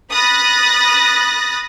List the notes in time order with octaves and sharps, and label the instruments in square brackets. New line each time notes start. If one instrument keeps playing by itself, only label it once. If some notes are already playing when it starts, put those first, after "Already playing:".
[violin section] B5 D#6 F#6 A6 A#6